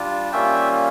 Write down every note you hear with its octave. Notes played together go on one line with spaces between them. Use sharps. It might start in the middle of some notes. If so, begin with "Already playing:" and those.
Already playing: G3 D4 F4
G3 A#3 C#4 F4 E5 G5